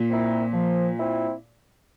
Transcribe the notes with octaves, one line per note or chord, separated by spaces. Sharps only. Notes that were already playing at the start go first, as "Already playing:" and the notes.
Already playing: A#2
C4 E4 A#4
F3
C4 E4